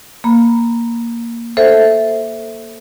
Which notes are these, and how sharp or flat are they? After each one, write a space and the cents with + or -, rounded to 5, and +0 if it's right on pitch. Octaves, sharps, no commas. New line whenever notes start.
A#3 +0 B5 +0
A4 +0 C5 +0 E5 +0